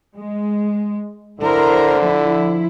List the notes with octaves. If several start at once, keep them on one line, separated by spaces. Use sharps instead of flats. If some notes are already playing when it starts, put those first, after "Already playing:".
G#3
D3 E4 A#4 C5
F3 E4